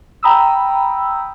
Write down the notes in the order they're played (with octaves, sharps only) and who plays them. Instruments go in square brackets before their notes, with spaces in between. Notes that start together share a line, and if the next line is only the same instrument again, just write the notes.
[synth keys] G5 A#5 B5 D#6 E6